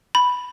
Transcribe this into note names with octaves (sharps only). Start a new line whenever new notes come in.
B5